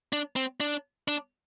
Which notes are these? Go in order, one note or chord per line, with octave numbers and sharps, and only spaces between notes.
D4
C4
D4
D4